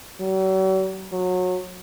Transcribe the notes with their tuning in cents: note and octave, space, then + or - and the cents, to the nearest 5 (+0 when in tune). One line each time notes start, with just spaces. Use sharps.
F#3 +45
F#3 -25